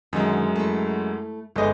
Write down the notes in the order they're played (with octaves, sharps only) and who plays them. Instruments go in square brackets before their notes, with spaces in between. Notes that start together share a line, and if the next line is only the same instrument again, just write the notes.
[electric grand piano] F#2 F#3 G#3 [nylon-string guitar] D3 D#3 D#4
[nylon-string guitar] A3 E4
[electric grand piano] G1 G#3 D#5 [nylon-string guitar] A4 G#5